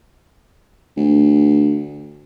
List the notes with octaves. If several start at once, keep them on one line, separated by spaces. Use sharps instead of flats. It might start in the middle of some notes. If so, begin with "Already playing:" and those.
D2